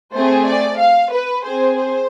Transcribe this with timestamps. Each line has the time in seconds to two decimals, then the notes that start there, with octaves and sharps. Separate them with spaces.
0.14 A3 C4 G#4 C5
0.47 D5
0.79 F5
1.12 B4
1.45 C4 G#4 C5
1.77 C5